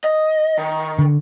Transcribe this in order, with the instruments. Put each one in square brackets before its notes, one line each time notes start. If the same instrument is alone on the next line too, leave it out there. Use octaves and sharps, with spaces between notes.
[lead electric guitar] D#5
D#3
[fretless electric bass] D3